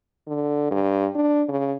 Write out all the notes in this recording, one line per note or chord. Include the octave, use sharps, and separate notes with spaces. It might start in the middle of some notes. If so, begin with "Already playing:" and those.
D3
G2
D4
C#3